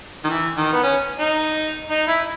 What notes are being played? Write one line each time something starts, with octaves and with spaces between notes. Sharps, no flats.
D#3
E3
D#3
B3
C#4
D#4
D#4
E4